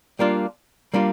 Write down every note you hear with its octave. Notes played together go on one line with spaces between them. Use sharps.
G3 A#3 D4 F4
G3 A#3 D4 F4